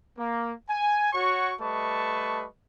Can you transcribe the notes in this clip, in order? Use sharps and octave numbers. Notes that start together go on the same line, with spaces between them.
A#3
G#5
F#4 C#5 C#6
G3 A3 B4 D#5 A5 C#6